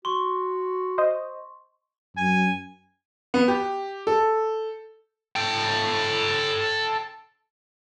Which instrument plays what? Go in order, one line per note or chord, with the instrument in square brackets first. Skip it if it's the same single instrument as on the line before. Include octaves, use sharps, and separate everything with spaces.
[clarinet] F#4 [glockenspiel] C6 C#6
[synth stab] C5 D#5
[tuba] F#2 [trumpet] G#5
[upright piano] B3
G4
A4
[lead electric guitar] A4 G5